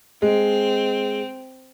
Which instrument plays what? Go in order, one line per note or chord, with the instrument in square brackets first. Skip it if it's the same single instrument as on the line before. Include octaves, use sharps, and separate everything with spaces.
[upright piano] G#3 [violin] C4